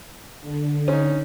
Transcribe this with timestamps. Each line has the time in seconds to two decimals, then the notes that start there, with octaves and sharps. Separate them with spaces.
0.41 D3
0.88 C#4 D#4